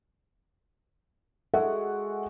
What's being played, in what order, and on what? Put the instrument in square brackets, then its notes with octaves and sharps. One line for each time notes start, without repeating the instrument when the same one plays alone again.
[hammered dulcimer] G#3 F#4 G#4 [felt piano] A4 E5 F#5